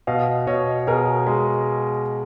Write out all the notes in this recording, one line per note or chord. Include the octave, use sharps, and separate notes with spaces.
B2 D#5 F5
B2 C#5 D#5
B2 G#4 A#4
G#3